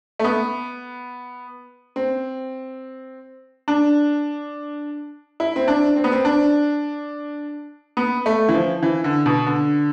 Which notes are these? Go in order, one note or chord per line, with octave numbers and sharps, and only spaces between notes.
A3
B3
C4
D4
E4
C4
D4
C4
B3
C4
D4
B3
A3
E3
F3
E3
D3
B2
D3